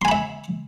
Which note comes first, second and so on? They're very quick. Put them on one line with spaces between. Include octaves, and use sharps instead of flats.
C6 G#5 B5 E5